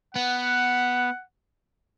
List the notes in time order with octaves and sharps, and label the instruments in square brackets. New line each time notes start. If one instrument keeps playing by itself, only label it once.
[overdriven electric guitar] B3 [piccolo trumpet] F#5